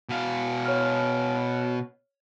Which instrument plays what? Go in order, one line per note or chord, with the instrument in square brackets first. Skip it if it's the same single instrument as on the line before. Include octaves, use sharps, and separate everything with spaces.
[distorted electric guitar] B2 F5
[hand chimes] C#5 F6